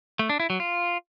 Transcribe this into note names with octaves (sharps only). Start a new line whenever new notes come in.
A3
D4
E4
F#3
F4